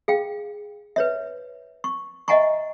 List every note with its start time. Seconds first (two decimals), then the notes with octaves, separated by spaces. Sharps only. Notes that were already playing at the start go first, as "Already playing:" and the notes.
0.08 G#4 F5 G5
0.96 B4 C#5 E5
1.84 C#6
2.28 D#5 E5 F#5 G#5 A#5 C#6